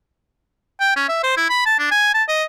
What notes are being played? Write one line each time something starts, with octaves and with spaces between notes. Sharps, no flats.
G5
C#4
E5
C5
E4
B5
A5
D4
G#5
A5
D#5